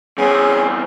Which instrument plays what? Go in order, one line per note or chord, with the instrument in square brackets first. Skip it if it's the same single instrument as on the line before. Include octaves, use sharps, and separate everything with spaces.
[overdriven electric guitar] E2 C4 [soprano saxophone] C#4 [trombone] G#4